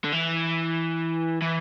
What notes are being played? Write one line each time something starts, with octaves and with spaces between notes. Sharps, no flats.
D3
E3
E3